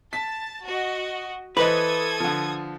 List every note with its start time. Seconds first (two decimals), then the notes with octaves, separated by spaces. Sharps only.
0.13 A5 B6
0.65 F#4 D#5
1.57 E3 A4 B4 C5 D#5 D#6 G#6
2.20 D3 F3